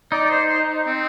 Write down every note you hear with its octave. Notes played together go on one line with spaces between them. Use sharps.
D#4 D5
D5
C5
C5
C4